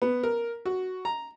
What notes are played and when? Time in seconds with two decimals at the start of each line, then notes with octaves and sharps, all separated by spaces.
0.02 B3
0.23 A#4
0.66 F#4
1.05 A#5